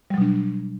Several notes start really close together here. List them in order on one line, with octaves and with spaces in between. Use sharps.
G3 F#3 B2 D4